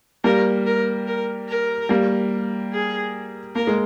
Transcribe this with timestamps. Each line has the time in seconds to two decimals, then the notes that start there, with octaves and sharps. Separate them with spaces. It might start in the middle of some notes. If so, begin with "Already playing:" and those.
0.24 G3 A#3 A#4
0.66 A#4
1.07 A#4
1.49 A#4
1.89 G3 A#3
2.72 G#4
3.55 A#3 A#4
3.67 G#3